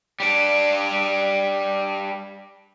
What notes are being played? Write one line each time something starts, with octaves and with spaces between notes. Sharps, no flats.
G3 D4